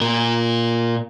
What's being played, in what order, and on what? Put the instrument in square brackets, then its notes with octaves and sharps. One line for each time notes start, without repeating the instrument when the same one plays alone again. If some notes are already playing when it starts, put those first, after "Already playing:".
[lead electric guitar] A#2 A#4